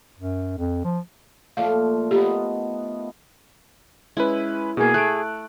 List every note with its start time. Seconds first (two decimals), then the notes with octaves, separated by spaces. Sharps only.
0.18 F#2
0.58 F2
0.84 F3
1.57 A#2 F3 A3 F5
2.11 B3 D#4 F4 G4
4.17 G#3 C#4 E4 B4
4.77 B2 A#3 G#4
4.94 A3 F#6 D7